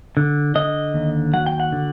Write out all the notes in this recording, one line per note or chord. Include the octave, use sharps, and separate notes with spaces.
D3
D3 D#5
D#2
F#3 F#5
G5
F#5
D3